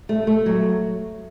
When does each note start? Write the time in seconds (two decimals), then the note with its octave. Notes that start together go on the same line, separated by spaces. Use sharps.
0.09 A3
0.27 A3
0.46 F#3